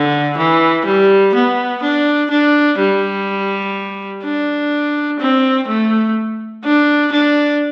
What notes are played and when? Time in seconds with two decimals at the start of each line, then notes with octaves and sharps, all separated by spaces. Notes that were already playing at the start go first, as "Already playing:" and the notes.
Already playing: D3
0.38 E3
0.86 G3
1.35 B3
1.83 D4
2.30 D4
2.79 G3
4.24 D4
5.20 C4
5.68 A3
6.64 D4
7.12 D4